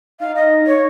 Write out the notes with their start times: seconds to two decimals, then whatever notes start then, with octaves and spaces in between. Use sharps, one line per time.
0.20 D#4 F5
0.36 D#5
0.67 C#5